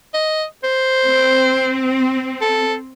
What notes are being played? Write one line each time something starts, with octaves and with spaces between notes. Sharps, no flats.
D#5
C5
C4
A4